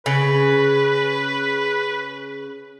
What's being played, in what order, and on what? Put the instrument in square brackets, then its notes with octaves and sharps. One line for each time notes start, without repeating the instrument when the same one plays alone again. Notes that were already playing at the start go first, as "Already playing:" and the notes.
[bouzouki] C#3 [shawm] B4